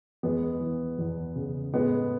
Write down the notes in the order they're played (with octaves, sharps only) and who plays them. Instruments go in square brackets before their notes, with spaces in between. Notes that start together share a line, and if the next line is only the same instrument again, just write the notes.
[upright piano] E2 G#3 B3
E3
E2
C#3
A2 G#3 B3